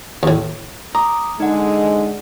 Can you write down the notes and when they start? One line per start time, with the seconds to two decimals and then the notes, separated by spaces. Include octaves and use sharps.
0.23 D#2 A2
0.95 A#5 D6 D#6
1.40 D3 G#3 D#4 F#5